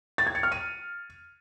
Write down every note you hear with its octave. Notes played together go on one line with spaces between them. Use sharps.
A6
G#6
C#7
F6
D#7